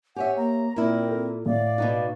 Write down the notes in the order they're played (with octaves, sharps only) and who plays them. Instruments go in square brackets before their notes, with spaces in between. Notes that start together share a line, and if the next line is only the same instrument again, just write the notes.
[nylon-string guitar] G4 C#5 E5 [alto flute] F#5 [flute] G#5
[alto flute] A#3 [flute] A#5
[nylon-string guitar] A#2 E4 [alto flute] C4 [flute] A#4
[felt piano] A4
[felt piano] A2 [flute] D5 [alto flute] F5
[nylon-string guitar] B2 D#4 F#4